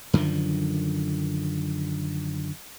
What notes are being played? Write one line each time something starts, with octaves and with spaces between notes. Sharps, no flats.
F#2 D3 D#3 F3